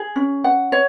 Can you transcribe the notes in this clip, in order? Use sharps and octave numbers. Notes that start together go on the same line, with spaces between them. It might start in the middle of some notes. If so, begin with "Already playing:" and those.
Already playing: G#4
C#4
F#5
C#5